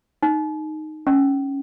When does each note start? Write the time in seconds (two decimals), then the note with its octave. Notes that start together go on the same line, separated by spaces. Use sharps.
0.23 D#4
1.07 C#4